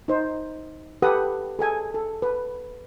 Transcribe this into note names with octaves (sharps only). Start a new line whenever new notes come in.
D#4 C5
G4 A4 B4 F#5 D#6
G#4 A4 G#5
A4
B4